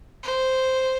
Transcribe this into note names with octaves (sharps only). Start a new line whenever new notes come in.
C5